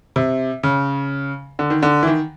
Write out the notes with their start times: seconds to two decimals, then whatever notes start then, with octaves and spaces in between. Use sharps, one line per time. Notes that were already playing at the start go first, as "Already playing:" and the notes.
0.16 C3
0.63 C#3
1.59 D3
1.70 D#3
1.83 D3
2.03 E3
2.07 D#3